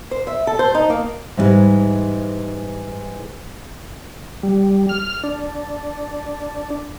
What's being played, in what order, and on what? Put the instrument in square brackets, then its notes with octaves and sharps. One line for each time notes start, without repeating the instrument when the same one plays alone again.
[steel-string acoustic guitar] C5
E5
A4
C5
D#4
A#3
[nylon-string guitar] G#2 E3 F3 G3 G#3
[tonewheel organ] G3
F6
D4